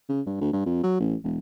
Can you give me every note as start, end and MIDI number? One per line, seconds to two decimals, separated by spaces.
0.09 0.21 49
0.26 0.40 43
0.41 0.51 38
0.53 0.61 43
0.66 0.83 41
0.83 1.00 54
1.00 1.15 33
1.23 1.39 28